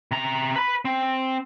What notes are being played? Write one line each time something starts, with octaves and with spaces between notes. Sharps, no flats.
C3 A#5
B4 B5
C4